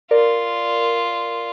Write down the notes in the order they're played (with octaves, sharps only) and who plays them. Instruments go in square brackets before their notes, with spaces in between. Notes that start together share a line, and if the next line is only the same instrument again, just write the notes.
[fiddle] F4 [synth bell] A#4 D5